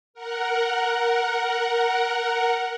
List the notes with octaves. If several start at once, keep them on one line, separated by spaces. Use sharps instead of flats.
A#4 F#5